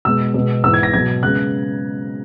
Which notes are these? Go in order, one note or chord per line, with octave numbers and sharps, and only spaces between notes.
B2 G#3 B3 E6
B2 G#3 B3
G#2 E3 G#3 B3 E6
G#6
A#6
B2 F#3 B3 G#6
C#3 G#3 B3 F#6